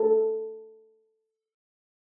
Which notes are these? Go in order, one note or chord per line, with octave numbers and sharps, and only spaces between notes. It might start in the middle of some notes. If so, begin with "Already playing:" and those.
Already playing: A4